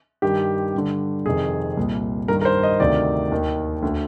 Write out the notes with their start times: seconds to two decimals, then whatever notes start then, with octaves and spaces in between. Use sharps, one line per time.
0.22 G2 D#3 G4
0.75 G2 D3
1.26 F2 C3 D#3 G#4
1.77 C2 A#2
2.28 G2 D#3 A#4
2.41 A#4
2.45 C5
2.63 D#5
2.80 D2 C3 D#3 D5
3.32 D#2 D#3
3.82 D2 D3